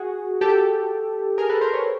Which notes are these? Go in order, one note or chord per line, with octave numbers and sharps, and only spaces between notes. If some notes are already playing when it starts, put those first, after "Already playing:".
Already playing: F#4 G#4
G4 A4
G#4 A#4
A4 B4
A#4 C5
B4 C#5